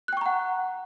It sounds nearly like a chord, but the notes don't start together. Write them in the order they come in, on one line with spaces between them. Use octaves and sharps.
F#6 G5 C#6 A#5 F#5